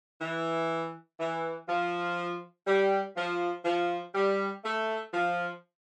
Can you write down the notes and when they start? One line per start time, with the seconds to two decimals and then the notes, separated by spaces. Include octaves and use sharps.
0.21 E3
1.20 E3
1.68 F3
2.67 G3
3.16 F3
3.65 F3
4.14 G3
4.64 A3
5.13 F3